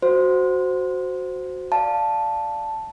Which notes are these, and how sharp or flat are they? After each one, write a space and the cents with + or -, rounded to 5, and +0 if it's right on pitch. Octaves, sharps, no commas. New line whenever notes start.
F#4 +0 C5 -10
D5 +0 F5 +0 A5 +0